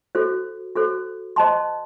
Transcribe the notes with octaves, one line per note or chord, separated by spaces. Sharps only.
F#4 A4 C5
F#4 A4 C5
C5 D#5 A5 C6